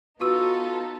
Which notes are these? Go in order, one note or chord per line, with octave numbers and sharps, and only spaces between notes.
B3 D#4 F4 F#4 A4 B4 C#6 E6